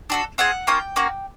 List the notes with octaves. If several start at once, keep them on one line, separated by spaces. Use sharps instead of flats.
D4 F#4 A4
C4 F4 G#4 F#5
A#3 C#4 F4 G5
A#3 C#4 F#4